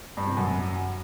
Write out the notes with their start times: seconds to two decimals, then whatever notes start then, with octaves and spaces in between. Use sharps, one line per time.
0.17 G2
0.27 C3
0.37 F#2